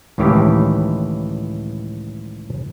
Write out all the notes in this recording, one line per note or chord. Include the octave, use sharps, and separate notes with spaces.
C#2 A2 D#3 E3 G4